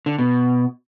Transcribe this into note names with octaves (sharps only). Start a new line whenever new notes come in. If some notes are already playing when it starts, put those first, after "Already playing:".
D3
B2